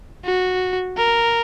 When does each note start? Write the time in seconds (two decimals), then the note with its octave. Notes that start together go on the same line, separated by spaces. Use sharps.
0.25 F#4
0.97 A#4